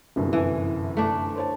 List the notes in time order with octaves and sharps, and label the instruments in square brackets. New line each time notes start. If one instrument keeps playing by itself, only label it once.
[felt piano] G1 C2 F#2
[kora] E3
A3 D4
[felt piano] C5 C#5 A5